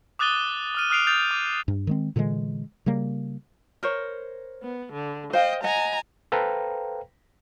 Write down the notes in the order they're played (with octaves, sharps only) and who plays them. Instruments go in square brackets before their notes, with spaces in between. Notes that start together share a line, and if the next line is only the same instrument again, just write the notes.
[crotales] D6 D#6 F#6 A6 D#7 G7
G7
D#6 F6 D#7
D#6 F6 F#6 C7 D7 F7
D#6 G6 A6 F7
D6
[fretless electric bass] G2
D#3 G#3 C4
A#2 D3 E3 G#3
C#3 G3 A#3
[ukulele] A#4 C5 C#5
[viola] B3
D3
[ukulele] C5 F5 [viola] D#5 G5
[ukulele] D#5 F#5 [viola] G#5 A#5
[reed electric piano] A4 B4 C5 F5 G5 A#5